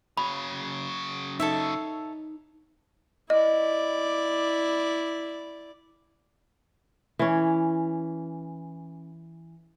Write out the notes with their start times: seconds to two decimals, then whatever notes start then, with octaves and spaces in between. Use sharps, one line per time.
0.17 C#3 F#3 B5
1.40 D#4 A4 C#5 E5
3.30 E4 D5 D#5
7.19 E3 C#4